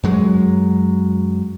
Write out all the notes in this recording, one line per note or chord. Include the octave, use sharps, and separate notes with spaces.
F#2 F#3 G#3